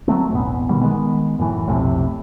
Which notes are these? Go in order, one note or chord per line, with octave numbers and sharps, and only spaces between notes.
F#3 G#3 A3 C4
E1 A1 B3
B2 D#3 G3
D#3 G#3 B3
F#2 A2 E3
B1 F2 A2 C3